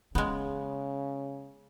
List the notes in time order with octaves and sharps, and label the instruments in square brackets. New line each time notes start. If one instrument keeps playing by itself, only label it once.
[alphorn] C#3 [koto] G#3 B3 [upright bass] C#4